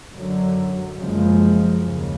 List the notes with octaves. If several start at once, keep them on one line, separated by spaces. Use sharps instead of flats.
F#2 D3 F#3
F#1 F#2 C#3 F3 G#3
D#2 C#3